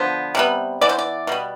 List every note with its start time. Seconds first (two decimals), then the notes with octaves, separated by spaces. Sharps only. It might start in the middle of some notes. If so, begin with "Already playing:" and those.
Already playing: D3 F3 B3 C5
0.35 C3 G3 B3
0.81 E3 B3 D5
0.89 C5
0.99 D5
1.27 B2 G3 B3